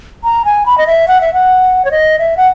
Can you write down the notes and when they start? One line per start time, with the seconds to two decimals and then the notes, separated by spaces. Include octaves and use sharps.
0.24 A#5
0.45 G#5
0.66 B5
0.78 D#5
0.87 E5
1.08 F#5
1.21 E5
1.34 F#5
1.85 C#5
1.91 D#5
2.19 E5
2.37 F#5